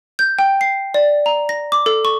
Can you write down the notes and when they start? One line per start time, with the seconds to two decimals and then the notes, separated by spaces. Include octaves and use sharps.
0.19 G6
0.39 G5
0.61 C7
0.94 D5
1.26 A#5
1.49 A#6
1.72 D6
1.86 A4
2.05 C#6